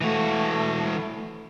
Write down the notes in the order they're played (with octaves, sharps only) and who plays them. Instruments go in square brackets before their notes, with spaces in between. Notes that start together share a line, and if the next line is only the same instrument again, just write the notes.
[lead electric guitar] E3 F#4 [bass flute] A3